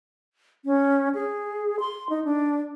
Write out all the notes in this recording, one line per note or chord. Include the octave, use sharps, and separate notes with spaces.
C#4
G#4
C6
D#4
D4